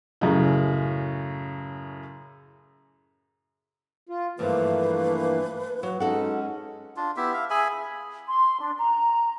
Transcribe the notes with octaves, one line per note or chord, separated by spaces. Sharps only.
F#2 A2 C#3
F4
G2 D3 E3 F3 A3 A#3 B4
F#3 B4
G#3 C#4 D#4 F#4 A4 F#5
D4 F4
B3 E4 G4 E5
E5 F5
G#4 E5 G#5 B5
C6
D4
A#5